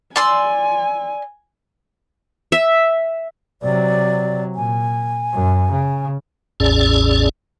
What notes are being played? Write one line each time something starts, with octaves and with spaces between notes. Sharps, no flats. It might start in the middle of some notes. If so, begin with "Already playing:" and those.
D5 G#5 C6 E6
E5
C3 F#3 D5
A#2 G#5
F#2
C#3
A1 E2 A2 C#4 G#4 D5